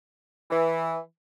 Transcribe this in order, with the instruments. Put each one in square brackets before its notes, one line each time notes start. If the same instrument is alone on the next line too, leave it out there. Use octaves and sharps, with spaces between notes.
[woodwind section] E3